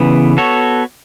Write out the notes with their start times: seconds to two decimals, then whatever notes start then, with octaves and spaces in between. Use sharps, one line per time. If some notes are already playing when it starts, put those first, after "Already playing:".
Already playing: C#3 E3 B3
0.37 B3 F#4 A4 C#5